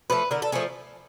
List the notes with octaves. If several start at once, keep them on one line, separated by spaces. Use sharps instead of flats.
F3 A3 B4
D3 A#4
A4
F3 A3 G#4